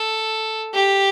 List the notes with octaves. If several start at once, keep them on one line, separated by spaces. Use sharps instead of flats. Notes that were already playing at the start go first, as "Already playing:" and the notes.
Already playing: A4
G4